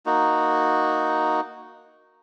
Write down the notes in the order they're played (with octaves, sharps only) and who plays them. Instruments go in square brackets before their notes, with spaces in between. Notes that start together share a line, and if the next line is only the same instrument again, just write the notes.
[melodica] A#3 D#4 F#4